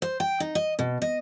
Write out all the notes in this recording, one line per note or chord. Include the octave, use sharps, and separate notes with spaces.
C5
G5
D#4
D#5
B2
D#5